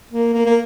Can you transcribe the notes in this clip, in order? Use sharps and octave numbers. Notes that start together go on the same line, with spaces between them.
A#3
A#3
A#3